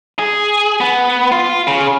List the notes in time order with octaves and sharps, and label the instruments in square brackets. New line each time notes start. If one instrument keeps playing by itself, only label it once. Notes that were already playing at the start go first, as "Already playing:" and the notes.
[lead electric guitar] G#4
B3
F4
C#3